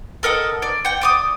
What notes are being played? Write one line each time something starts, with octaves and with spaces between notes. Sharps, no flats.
A4 A#4 D#5 F#5
D5
F#5 G5
D5 D6 D#6